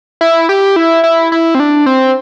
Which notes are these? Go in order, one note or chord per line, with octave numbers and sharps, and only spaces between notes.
E4
G4
E4
E4
E4
C4
D4
C4